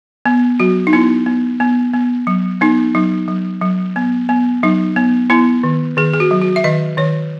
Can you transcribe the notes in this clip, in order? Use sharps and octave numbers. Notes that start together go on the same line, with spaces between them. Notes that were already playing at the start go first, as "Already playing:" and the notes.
B3
F#3 F#4
D#4
B3 E4
B3
B3
B3
F#3
B3 D#4
F#3 D#4
F#3
F#3
B3
B3
F#3 D#4
B3
B3 E4
D#3
D#3 G#4
G#4
F#4
F#3
F#4
E5
D#3 D#5
D#3 C#5